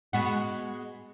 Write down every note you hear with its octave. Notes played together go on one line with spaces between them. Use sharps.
G#3 B3 F#4